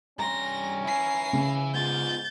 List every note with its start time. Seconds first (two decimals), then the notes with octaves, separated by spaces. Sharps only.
0.19 G2 C#4 A#5 C6 A#6
0.84 E4 G#5 A#6 C7
1.33 C#3
1.74 G#2 B3 F4 G6 A6